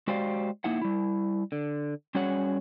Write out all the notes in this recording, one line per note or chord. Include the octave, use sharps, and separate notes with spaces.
G#3 F#4 G4 C5 D5 F5
A#3 D#4 E4 F#5
G3 E4
D3
G3 C#4 F#4 G#4 C#5 F#5